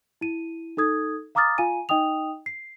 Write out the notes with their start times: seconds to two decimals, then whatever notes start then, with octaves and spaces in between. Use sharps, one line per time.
0.21 E4 D#7
0.77 D#4 A4 D#6 G#6
1.35 F5 A#5 D6 D#6 F6 A6
1.58 F4 F5 G#5 D#7
1.89 D#4 D#5 G5 D#6 F7
2.46 C7